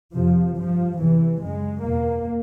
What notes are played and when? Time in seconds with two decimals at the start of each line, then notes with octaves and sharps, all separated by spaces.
0.14 F2 C3 F3
0.56 G2 F3
0.98 E2 C3 E3
1.41 F#2 C#3 G#3
1.82 E2 B2 A#3